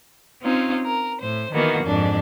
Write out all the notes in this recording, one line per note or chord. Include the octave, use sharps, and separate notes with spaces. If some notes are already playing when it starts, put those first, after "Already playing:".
C4 C#4 D#4 F4
A#4
A2 C5
D#3 E3 A#3 B3 F#4
F2 G#2 D4